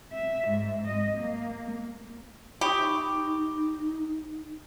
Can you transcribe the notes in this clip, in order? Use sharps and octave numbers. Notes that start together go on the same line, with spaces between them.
E5
G#2
D#5
A#3
D#4 G4 B5 C#6 D#6